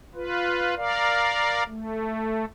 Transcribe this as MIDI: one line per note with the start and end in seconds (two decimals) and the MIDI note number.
0.15 0.75 65
0.15 0.75 71
0.76 1.63 70
0.76 1.63 74
0.76 1.63 77
1.68 2.45 57